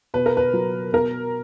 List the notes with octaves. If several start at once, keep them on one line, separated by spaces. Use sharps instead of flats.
B2 B4
A#4
B4
F#3
B2 A#4